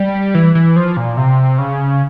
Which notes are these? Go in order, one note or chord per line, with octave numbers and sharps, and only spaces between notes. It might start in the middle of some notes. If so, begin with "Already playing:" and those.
Already playing: G3
E3
E3
F3
A#2
C3
C#3